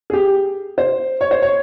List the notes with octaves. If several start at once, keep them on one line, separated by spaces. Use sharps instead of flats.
G#4
G4
C5
C#5
C5
C#5